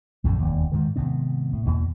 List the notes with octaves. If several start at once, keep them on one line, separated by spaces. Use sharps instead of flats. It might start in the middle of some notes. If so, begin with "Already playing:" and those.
A#1 F#2 A2 C#3
E1 D#2
G#2 D#3 E3
G#1 C3 B3 C4
A2
E2 B2 E3 A#3